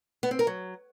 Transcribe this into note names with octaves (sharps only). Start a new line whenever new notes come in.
B3
C4
A#4
F#3